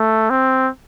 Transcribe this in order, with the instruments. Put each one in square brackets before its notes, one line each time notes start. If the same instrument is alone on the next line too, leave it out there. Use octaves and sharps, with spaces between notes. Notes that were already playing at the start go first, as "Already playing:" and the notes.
Already playing: [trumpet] A3
C4